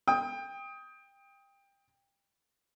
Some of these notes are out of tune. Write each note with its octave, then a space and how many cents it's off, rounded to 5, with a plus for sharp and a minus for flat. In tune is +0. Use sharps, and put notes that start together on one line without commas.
G5 +20 D#6 +20